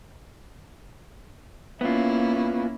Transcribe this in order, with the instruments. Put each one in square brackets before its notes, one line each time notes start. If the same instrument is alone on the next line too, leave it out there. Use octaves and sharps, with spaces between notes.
[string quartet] A#3 C#4 E4 [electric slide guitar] B3 F4